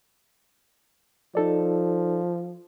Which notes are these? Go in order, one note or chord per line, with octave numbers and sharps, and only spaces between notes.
F3 D#4 A4 D5